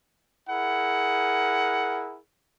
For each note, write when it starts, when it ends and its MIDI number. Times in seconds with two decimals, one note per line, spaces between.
0.50 2.18 64
0.50 2.18 68
0.50 2.18 70
0.50 2.18 78